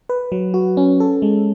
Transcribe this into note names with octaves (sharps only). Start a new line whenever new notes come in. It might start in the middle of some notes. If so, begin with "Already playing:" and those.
B4
F#3
F#4
C#4
A4
G#3